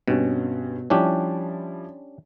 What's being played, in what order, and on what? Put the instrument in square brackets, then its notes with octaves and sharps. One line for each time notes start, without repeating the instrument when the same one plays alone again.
[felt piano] G2 C4 C#4 [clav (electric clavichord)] B2
[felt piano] F3 G3 E4 [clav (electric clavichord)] C#4 D4 G4